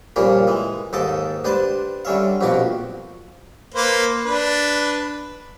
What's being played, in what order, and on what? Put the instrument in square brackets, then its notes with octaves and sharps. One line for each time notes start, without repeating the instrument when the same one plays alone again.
[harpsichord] A#2 C#3 F3 G3 A#3 G4
E3 G#3
D#2 G#2 A4 D#5 D6
D4 G4 B4 C5 G5 A5
D3 G3 C#4 E5 F5
A#1 F2 B2 F#4 G4 D6
[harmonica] A#3 B4 C5
D4 B4